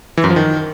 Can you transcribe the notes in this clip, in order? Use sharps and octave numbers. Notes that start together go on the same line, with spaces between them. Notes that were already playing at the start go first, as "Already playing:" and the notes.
E3
F#2
F3
D#3